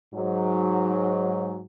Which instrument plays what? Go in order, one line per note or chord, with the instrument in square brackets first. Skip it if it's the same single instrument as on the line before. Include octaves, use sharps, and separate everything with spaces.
[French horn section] G#2 F#3